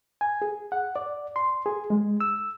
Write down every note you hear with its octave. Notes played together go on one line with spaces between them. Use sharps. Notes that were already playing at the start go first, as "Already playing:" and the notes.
G#5
G#4
F#5
D5
C6
G#4
G#3
E6